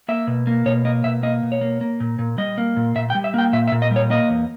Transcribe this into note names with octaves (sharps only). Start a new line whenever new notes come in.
A#3 E5
B2
A#3
B2 C#5
A#3 D#5
B2 E5
A#3 D#5
B2
C#5
A#3
A#3
A#2
A#2
G3 D#5
A#3
A#2
A#2 E5
G5
G3
E5
A#3 G5
A#2 E5
E5
A#2
D#5
G3
C#5
A#3 D#5
E2